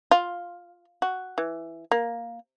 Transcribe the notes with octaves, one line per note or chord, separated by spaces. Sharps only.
F4
F#4
E3
A#3